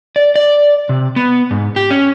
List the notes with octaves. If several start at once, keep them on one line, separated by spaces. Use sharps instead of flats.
D5
D5
C3
B3
G#2
G4
C#4